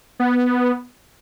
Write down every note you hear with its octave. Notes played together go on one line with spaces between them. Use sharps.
B3